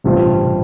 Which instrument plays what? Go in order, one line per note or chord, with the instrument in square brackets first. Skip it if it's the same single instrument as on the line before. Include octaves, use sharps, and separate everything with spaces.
[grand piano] A1 G2 G3 C4 F4 [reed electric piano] C3